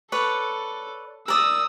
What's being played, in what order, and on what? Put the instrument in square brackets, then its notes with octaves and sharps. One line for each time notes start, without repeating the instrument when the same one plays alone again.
[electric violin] A4 [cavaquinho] B4 C#5 D5
[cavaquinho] A#4 D5 [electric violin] D#6 E6